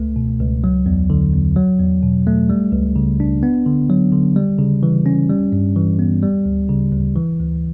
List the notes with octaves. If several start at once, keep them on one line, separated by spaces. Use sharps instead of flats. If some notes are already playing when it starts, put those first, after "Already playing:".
Already playing: C#2 A3
B2
C#2
F#3
E2
D3
E2
F#3
E2
B2
A3
G3
C#2
C#3
D4
B3
D3
F#3
D3
G3
C#3
E3
C#4
G3
G2
E3
B3
G3
D2
C#3
D2
E3
D2